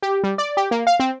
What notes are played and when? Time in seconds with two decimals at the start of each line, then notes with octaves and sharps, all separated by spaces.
0.03 G4
0.23 G3
0.38 D5
0.57 G4
0.71 A#3
0.87 F5
1.00 C4